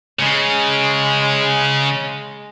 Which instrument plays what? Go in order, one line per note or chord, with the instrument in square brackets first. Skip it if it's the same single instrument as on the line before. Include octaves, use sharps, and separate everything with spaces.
[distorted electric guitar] C#3 [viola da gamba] G#3